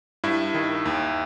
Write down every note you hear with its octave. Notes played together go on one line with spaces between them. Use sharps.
G2 E4 E5
D#3
D#2